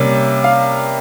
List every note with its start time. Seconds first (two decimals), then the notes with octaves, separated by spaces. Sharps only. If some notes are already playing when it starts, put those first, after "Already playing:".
Already playing: C3 G3 A#3 C#4
0.44 F5